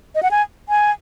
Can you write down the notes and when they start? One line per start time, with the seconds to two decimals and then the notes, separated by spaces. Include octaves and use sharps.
0.15 D#5
0.23 F#5
0.31 G#5
0.69 G#5